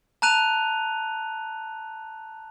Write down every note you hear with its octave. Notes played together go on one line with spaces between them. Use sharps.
A5 A#5 F#6 D#7 F7